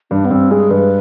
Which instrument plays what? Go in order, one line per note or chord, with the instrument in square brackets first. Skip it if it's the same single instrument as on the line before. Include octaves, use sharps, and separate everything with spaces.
[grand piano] G2 [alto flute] D4
[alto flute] B3
[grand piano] G2 [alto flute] C4
[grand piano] G#3 [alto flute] G#4
[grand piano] G2 [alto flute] B4